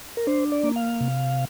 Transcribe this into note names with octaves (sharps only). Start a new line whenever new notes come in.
A#4
D4 C5
D5
A#3
F5
C3